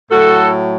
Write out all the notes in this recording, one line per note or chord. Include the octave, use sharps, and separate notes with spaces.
A2 F#3 F#4 A4